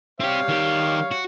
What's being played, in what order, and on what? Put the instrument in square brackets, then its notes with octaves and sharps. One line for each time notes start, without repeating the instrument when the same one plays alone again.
[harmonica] G3 C#5 F5 [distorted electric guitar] C4 G4
[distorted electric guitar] D#3 G4
F#4